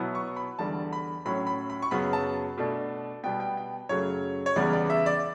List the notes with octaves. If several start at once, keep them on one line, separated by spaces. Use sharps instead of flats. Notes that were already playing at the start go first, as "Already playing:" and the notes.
Already playing: B2 F#3 B3 E4
C#6
B5
E2 D3 G3 A5
B5
A2 F#3 C#4 B5
B5
B5
C#6
F#2 C#3 F#3 B3 B5
A5
B2 A3 D4
B2 G3 B3 G5
G5
G5
F#2 C#3 F#3 A3 C#5
C#5
E2 C#3 G3 B3 D5
D5
E5
D5